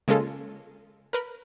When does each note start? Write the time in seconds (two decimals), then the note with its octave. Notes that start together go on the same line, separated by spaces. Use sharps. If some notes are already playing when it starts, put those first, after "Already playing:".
0.08 C#3 G#3 A#3 C#4 F4 A4
1.13 A#4 B4 B5